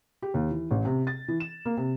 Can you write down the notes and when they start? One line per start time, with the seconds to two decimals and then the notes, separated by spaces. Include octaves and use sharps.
0.22 G4
0.34 D#2
0.51 E3
0.71 A1
0.85 C3
1.07 A6
1.28 E3
1.40 E7
1.66 A#3
1.77 C3